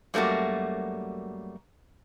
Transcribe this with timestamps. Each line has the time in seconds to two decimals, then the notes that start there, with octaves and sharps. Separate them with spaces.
0.14 F#2 G3 A3 A#3 F#4